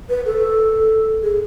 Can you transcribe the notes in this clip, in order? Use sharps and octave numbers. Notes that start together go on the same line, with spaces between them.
B4
A4
G#4